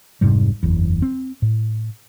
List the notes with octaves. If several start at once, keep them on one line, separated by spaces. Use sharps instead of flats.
F1 G#2 C3 G3
F#1 E2
C4
A2